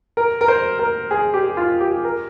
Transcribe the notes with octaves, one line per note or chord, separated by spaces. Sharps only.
A#4
A#4
C5
A#4
G#4
G4
F4
G4
A#4